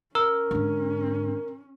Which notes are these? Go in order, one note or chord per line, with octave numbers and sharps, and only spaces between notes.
C#4 A#4 E6
G#2 D3